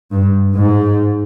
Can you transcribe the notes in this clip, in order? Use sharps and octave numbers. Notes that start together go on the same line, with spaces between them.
G2
G#2